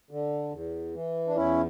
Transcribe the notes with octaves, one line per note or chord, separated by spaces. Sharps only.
D3
E2
E3
D4
E2 C#4 E4